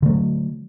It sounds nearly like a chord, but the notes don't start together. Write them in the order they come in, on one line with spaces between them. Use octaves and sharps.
D3 A3 F#3